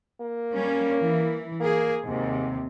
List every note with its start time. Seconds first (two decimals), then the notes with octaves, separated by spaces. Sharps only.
0.21 A#3
0.55 G3 C#4
1.02 E3
1.60 A#3 G#4
2.05 D#2 G#2 C3